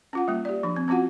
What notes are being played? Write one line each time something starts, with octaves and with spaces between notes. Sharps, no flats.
C#4 F4 F#5
G3 A#3
G4 D5
F3 D4
C4
C4 C#4 F4 F#4 F#5